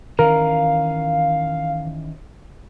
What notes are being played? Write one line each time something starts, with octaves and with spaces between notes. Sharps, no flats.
D#3 E3 C#4 A#4 F5